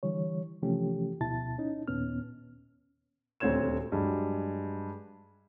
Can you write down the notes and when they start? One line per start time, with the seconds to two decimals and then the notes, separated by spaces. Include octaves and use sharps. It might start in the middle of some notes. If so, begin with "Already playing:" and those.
0.03 D3 E3 G3 C#5
0.62 C3 E3 F3 A3 C#4 G4
1.21 D2 B2 E4 A5 A6
1.58 C#4 D#4
1.88 D#2 A#2 B3 C#4 F6
3.40 D#1 D2 C4 C#5 G#6 E7
3.92 G2 F#3 G#3